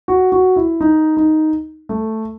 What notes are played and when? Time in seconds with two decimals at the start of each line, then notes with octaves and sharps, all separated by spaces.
0.08 F#4
0.32 F#4
0.56 E4
0.81 D#4
1.17 D#4
1.89 A3